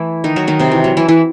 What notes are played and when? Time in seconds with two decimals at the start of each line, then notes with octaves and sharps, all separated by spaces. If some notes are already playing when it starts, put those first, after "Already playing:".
Already playing: E3 A3 E4
0.24 D#3 D#4
0.36 F#3 F#4
0.47 D#3 D#4
0.60 C3 C4
0.72 E3
0.84 F#3
0.97 E3 E4
1.08 E3 E4